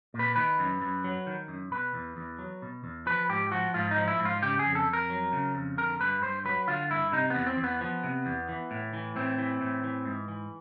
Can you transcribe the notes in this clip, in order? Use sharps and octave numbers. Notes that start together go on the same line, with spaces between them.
A#2
B4
D#3 B4
F#2
F#2
F#3
D#3
F#2
B2 B4
E2
E2
F#3
B2
E2
F3 B4
G#2 G4
F3 F#4
G#2 F4
D#4
F3
E4
G#2
F4
C#3 G4
G#4
F2
A4
F2
A#4
F#3
C#3
F2
D3 A#4
G2 B4
G2 C5
F#3 B4
D3 F4
G2 E4
C3 D#4
E2 B3
C4
E2
B3
F3 B3
C3
E2
E3
A2
E3
A2 C4
E3
A2
E3
G#2
E3